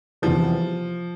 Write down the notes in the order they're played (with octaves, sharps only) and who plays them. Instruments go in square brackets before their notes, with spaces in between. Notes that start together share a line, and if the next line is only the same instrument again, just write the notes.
[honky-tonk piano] E2 C3 E3 G3 [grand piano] F3